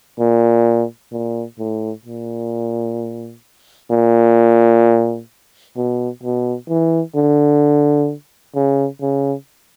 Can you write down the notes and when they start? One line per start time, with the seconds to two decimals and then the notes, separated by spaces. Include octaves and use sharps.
0.19 A#2
1.12 A#2
1.59 A2
2.05 A#2
3.91 A#2
5.77 B2
6.23 B2
6.69 E3
7.16 D3
8.55 C#3
9.01 C#3